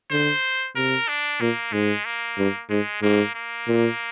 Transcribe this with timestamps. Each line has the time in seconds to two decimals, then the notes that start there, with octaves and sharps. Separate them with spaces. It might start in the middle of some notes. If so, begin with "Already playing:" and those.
0.11 D3 C5
0.76 C3 A#4
1.09 D4
1.41 A#2 A#3
1.73 G#2 G#3
2.05 A#3
2.38 G2
2.70 G#2 G#3
3.02 G#2 A#3
3.35 A#3
3.68 A#2